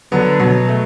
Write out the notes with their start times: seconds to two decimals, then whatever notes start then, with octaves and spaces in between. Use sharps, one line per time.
0.12 D3 F#3 B3
0.40 B2 F#3
0.68 A3